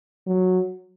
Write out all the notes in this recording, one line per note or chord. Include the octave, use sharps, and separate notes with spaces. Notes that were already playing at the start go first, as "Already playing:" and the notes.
F#3